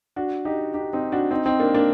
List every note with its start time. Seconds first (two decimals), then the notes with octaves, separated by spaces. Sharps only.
0.16 D4 F#4
0.45 D#4 G4
0.74 D#4 G4
0.93 C4 D#4
1.12 D4 F#4
1.31 C4 D#4
1.45 C4 D#4
1.59 A#3 D4
1.74 A#3 D4